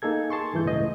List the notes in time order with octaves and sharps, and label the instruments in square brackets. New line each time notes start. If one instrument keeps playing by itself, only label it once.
[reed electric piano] A#3 D#4 G#4 A4 G#6
G#4 A5 C6 C#6
G2 E3 G6
C#2 A2 D#5